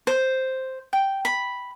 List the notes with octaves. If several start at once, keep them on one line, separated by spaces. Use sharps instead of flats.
C5
G5
B5